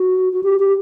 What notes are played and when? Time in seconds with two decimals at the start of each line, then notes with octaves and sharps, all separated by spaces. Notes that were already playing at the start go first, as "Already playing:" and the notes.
Already playing: F#4
0.33 F#4
0.43 G4
0.59 G4